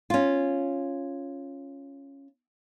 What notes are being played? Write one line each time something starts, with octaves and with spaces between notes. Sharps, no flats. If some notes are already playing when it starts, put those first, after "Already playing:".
C#4 F4